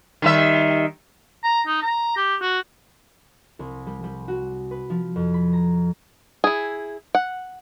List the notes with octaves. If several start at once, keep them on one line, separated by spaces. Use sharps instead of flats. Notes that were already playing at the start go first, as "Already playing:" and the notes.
D#3 G3 E5
A#5
D#4
A#5
G4
F#4
C2
G3
G3
F#4
B4
F3
F2
B5
A#5
E4 G#4
F#5